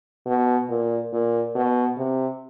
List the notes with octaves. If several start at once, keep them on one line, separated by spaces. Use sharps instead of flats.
B2
A#2
A#2
B2
C3